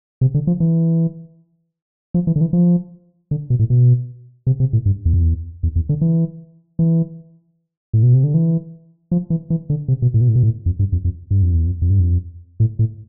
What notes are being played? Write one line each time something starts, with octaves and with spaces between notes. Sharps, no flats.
C3
D3
F3
E3
F3
E3
D3
E3
F3
D3
B2
A2
B2
C3
C3
A2
G2
E2
F2
E2
E2
E2
D3
E3
E3
A2
B2
C3
D3
E3
F3
E3
E3
D3
C3
B2
A2
B2
A2
B2
A2
F2
G2
F2
F2
G2
F2
E2
F2
F2
G2
F2
A2
A2